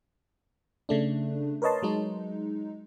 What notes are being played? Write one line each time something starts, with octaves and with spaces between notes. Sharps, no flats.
C#3 A3 D4
A#4 B4 C#5 D#5 A5 C6
F#3 G#3 D#4